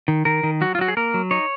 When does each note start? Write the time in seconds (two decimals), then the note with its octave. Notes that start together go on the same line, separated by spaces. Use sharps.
0.08 D#3
0.25 D#3 A#4
0.43 D#3
0.61 F#3 F#4
0.75 F4
0.79 F#3 F#4
0.88 G#4
0.97 A#3 A#4
1.14 F#3
1.31 D#4 C#5